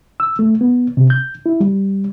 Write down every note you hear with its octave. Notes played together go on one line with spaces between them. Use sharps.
E6
A3
B3
C3
G6
E4
G3